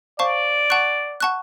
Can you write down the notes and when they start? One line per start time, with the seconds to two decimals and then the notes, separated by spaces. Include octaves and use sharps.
0.19 C5 D5 F5 A5 C#6
0.70 F#5 A5 C#6 F#6
1.20 F#5 A5 C#6 F#6